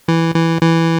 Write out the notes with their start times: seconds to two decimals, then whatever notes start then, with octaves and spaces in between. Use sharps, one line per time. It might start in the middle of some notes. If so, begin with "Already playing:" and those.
0.08 E3
0.35 E3
0.62 E3